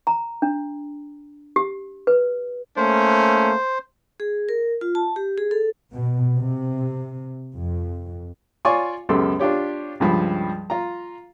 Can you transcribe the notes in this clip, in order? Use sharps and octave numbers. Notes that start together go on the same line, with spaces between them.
A#5
D4
G4
B4
A3 A#3 C#4 C5
G#4
A#4
F4
A5
G4
G#4
A4
B2
C3
F2
F4 C#5 D5 G#5 C6 C#6
C#2 F#2 B3 G4 A4 C6
D4 F4 G4 C#5
C#2 G2 F3 B5
F4 A#5